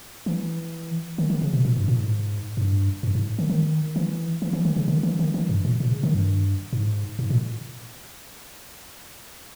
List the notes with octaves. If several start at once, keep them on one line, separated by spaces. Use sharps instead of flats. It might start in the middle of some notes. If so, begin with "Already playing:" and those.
E3
D#3
D#3
C#3
B2
A#2
G2
A#2
G#2
G2
G2
G#2
D#3
D#3
E3
E3
E3
D#3
C#3
D#3
E3
D#3
E3
G2
A#2
A#2
C#3
D#3
G2
G#2
G#2
A#2